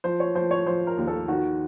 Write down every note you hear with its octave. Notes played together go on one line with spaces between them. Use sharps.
F3 C5
C#5
F3 C5
C#5
F3 C5
A#4
D#2
A4
D#3 F#4